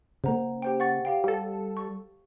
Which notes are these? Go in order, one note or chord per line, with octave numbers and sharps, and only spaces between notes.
C#3 A#3 C5 F#5 A#5
G4 C5 G5
F#5 C#6 A6
G4 F5 G5
G3 A4
C#6